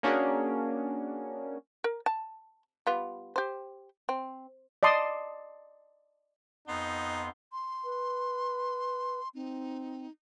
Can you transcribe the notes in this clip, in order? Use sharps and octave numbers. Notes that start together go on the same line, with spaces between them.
A#3 C#4 D4 F#4 G#4 A#4
A#4
A5
G3 B3 F4
G4 C5
C4
D5 D#5 A5 C6 D#6
F2 B3 D#4 C6
C6
B4
C4 D#4